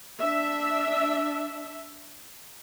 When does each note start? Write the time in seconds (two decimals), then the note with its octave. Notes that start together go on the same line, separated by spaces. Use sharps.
0.20 D4 E5